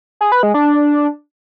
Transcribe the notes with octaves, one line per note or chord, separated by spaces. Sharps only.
G#4
B4
G#3
D4